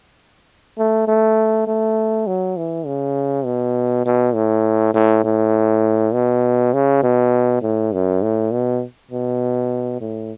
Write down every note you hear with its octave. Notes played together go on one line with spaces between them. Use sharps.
A3
A3
A3
F#3
E3
C#3
B2
B2
A2
A2
A2
B2
C#3
B2
A2
F#2
A2
B2
B2
A2